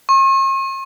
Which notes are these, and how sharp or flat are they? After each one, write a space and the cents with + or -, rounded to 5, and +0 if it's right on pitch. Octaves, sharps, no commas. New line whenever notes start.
C#6 -45